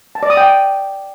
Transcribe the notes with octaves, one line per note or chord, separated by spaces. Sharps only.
A5
D5
D#6
G5